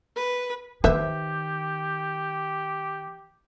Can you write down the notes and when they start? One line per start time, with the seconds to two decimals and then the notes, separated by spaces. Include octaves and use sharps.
0.16 B4
0.84 D#3 G4 B4 C5 E5